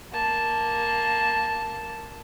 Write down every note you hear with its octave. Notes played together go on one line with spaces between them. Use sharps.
A#3 A5